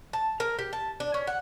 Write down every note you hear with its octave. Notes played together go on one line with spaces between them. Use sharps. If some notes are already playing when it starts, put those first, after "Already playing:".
A5
A#4
G4
A5
D4
C#4
F#5